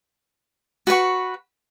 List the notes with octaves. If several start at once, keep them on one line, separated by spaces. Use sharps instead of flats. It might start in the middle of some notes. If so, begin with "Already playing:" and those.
F#4 B4 F#5 C#6